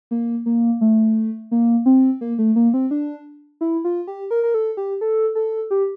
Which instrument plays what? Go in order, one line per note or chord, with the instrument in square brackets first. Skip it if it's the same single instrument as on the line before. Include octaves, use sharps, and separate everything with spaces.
[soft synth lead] A#3
A#3
A3
A#3
C4
A#3
A3
A#3
C4
D4
E4
F4
G4
A#4
A#4
A4
G4
A4
A4
G4